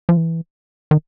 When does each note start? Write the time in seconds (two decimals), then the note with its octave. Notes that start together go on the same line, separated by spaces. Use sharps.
0.09 F3
0.17 E3
0.91 D#3